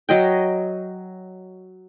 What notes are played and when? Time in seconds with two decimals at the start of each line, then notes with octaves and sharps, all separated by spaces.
0.09 F#3 D#5 G5